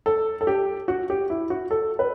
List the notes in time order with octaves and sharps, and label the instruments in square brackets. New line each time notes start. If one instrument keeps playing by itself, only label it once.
[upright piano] A4
A4
G4
F#4
G4
E4
F#4
A4
B4